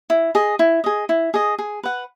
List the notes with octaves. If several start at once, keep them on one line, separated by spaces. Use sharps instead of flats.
E4
G#4 D#5
E4
G#4 D#5
E4
G#4 D#5
G#4
B4 F#5